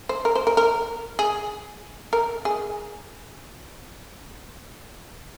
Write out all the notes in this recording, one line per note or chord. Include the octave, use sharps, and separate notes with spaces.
C5
A#4
C5
A#4
A#4
G#4
A#4
G#4